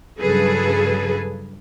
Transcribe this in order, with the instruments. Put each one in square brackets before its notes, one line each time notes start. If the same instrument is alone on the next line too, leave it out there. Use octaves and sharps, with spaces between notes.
[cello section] G2 C#3 F#3 G#4 A4 B4